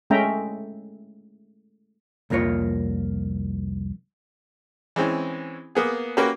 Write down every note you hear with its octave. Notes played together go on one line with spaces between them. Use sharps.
G#3 A3 C#4 E5 G5 A#5
C2 F2 A#3 F4 C#5
E3 G#3 C4 C#4
A#3 B3 G#4
A#3 C#4 F#4 G4 B4